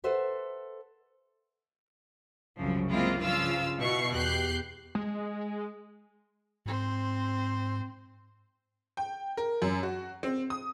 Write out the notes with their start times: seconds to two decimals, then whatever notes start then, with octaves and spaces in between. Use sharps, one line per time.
0.04 A4 B4 C5 E5 F#5
2.57 C2 F#2 C#3 F3
2.89 G#3 A#3 C4 E4 F4
3.19 G2 C#3 F3 F4 F5 E6
3.79 B2 E4 C#6 C7
4.13 E2 G4 F#6 G6 C7
4.95 G#3
6.66 G#2 C4 C5
8.97 G5
9.37 A#4
9.62 F#2
9.83 F#4
10.23 C4
10.50 D#6